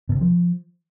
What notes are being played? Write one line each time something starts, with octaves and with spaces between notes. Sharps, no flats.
B2
C3
F3